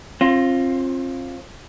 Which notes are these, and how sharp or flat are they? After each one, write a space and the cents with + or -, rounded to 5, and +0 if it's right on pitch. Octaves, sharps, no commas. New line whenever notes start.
C4 +35 F4 +0